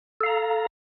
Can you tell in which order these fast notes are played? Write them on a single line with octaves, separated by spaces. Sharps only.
A4 F5 A#5